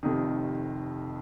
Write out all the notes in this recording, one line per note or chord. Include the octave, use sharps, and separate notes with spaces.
F1 F2 C3 D#3 D#6